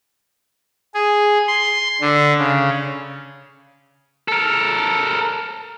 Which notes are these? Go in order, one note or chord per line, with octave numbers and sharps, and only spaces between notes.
G#4
C6
D3
C#3
A4 A#4